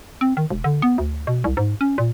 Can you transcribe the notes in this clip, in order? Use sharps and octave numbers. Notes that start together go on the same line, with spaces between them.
C4
D#3
E1
D3
B3
D2
B2
C2
G#2
C#4
A#2